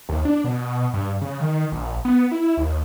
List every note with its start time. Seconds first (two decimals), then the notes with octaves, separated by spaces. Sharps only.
0.09 D#2
0.25 D4
0.44 B2
0.93 G2
1.21 C#3
1.40 D#3
1.72 A#1
2.05 B3
2.31 E4
2.57 D#2